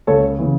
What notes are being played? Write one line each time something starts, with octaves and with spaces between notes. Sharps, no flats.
C#2 A4 C#5
C#3 E3